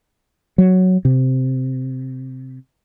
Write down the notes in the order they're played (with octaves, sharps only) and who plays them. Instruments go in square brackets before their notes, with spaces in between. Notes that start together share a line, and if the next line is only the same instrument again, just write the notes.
[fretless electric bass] F#3
C3